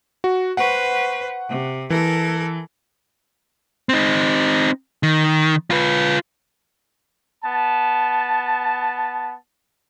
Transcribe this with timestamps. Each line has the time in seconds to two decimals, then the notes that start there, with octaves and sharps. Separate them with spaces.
0.24 F#4
0.57 B4 C5 F#5 C#6
1.49 C3
1.90 E3 A4 A#4
3.89 C4 D#4
5.03 D#3
5.71 F4 B4
7.44 B3 A5